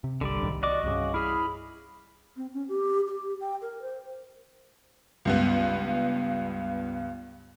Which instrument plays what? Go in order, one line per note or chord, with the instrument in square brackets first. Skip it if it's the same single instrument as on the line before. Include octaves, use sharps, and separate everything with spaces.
[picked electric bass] C3
[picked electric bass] G1 C2 [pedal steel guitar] D3 G3 D5
[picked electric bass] C2 A2 D#3
[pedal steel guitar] F#4 D#5 D6 [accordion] D5
[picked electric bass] C2 G2 [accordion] C#3
[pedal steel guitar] E4 G#4 [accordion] B5 F6
[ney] C4
C#4
G4
G4
G5
A#4
C5
[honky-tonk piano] C#2 G2 B3